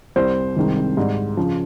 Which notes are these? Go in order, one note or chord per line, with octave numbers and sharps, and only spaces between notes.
C2 C3 G3 C5
C2 C3 D#3 G#3
G#2 G3
C#3 F3